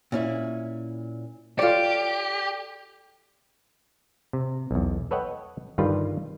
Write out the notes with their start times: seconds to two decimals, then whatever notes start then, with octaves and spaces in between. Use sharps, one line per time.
0.12 A#2 C#4 E4
1.59 F4 G4 A4 C#5 D5
4.33 C3
4.71 B1 E2
5.11 A4 B4 C#5 D#5 F#5 G5
5.78 G2 D3 D#3 G3 F4 B4